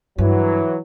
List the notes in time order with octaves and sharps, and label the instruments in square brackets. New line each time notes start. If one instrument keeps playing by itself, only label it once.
[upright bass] G2 [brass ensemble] E3 F#3